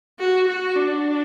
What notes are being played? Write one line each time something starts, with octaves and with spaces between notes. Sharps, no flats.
F#4
F#4
D4